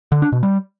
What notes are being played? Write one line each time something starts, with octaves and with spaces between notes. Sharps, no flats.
D3
D4
B2
G3